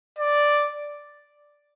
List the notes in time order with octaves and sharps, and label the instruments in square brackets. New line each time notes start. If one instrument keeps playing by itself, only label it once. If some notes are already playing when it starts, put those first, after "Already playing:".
[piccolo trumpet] D5